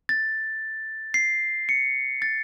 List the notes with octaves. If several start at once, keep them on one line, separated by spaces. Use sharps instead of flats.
A6
C7
C#7
A6